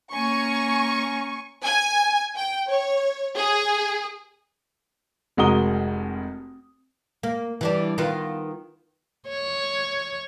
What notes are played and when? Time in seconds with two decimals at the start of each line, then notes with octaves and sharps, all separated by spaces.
0.13 A#3 C#4 G#5 A#5 C#6
1.63 G#5
2.36 G5
2.67 C#5
3.37 G#4
5.37 F1 G#3 F#4 A#4 D#6 G7
7.23 A#3
7.61 E3 G3 D4
7.98 D#3 B3 F4
9.29 C#5